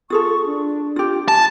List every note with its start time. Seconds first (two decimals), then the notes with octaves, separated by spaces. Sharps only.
0.10 F4 G#4 A4 C#6
0.46 D4
0.96 F4 G4
1.28 G#5 A5 A6